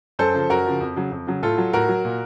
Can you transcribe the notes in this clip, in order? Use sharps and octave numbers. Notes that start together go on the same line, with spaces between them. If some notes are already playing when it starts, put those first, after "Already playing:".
F#2 A4 C5
C#3 F3
F#2 F#4 A#4
C#3 F3
F2
C#3 F#3
F2
C#3 F#3
A2 F4 A4
F#3
A2 F#4 A#4
F#3
A#2